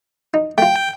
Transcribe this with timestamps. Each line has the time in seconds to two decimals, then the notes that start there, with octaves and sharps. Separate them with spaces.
0.34 D#4
0.58 A3 F4 G5